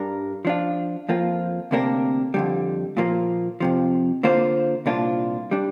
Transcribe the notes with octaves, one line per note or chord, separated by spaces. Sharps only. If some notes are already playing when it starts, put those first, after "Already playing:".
Already playing: G2 G3 D4 A#4
F3 D4 F4
F2 F3 A#3 F4
D2 C3 A#3 D4 A#4
F2 D3 G3
A#2 F3 A#3
F2 C3 F3
D3 A#3 F4 C5
C2 A#2 A#3 D4 F4
G3 D4